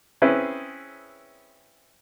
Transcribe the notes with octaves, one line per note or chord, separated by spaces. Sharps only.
C4 C#4 E4 G#4 B4